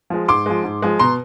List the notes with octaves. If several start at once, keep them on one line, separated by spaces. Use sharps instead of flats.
F3 G#3
G#2 C6 D6
F3 G#3
G#2
F3 G#3
B2 A#5 C6